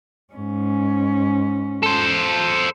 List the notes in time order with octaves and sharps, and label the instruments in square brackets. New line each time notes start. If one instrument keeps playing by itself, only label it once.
[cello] G#2 C#4
[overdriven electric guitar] A4 C5